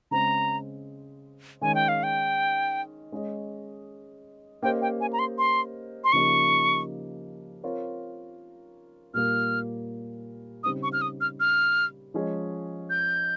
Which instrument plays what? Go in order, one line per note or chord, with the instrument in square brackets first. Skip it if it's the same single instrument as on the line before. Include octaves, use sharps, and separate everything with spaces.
[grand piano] C#3 G#3 C4 [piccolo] A#5
[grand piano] D#3 G#3 C#4 [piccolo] G#5
[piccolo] G5
F5
G5
[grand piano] G#3 C#4 G#4 D#5
[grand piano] A#3 C#4 G4 C5 D#5 [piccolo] G5
[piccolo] G5
G#5
A#5
C6
C6
C6
[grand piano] C#3 F3 A#3 D#4 G4 [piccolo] C#6
[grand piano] C4 F4 A#4 C#5
[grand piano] A#2 G3 A#3 [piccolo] F6
[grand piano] C#3 G3 C4 D#4 [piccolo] D#6
[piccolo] C#6
F6
D#6
F6
F6
[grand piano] F3 G#3 C#4 G#4 D#5
[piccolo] G6